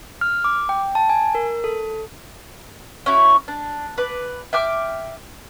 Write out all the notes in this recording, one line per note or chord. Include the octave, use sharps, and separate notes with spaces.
F6
D6
G5
A5
G#5
A#4
A4
C#4 E4 F#4
D4
B4 D5
E5 G5 D6 F6